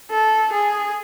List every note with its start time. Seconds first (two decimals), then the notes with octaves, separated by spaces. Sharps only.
0.10 A4
0.52 G#4